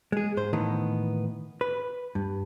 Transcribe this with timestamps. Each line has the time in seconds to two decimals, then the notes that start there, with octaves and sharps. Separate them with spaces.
0.12 G#3 G#4
0.37 G#2 C5
0.53 A2 D#3 E3 A#3 B3
1.61 B4
2.15 G2